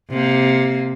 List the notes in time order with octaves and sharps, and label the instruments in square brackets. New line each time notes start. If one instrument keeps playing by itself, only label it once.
[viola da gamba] C3 A#3